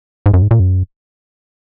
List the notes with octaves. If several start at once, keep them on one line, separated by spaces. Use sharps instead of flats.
G#2
F#2
G#2
A#2
F#2